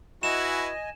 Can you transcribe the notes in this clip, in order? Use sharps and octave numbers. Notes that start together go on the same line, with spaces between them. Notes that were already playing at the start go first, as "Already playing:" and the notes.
E4 F#4 B4 D#5 G#5 E7